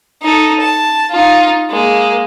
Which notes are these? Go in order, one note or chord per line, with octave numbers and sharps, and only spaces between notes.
D#4 A4
A5
D#4 F4
G#3 A#3